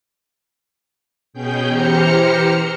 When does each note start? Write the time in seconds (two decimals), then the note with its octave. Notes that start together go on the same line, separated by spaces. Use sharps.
1.33 B2 C#4 G#4 G5 G6
1.68 E3 G4 C5 A#5 F6 C#7